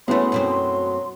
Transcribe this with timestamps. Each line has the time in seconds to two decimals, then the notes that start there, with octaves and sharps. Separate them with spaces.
0.08 F#3 G#3 A3 B3 C#4 E4 C6
0.32 F#2 B2 C4